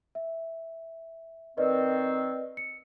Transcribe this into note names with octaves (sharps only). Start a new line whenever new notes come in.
E5
D#3 C4 B4 D5 D#5
C#7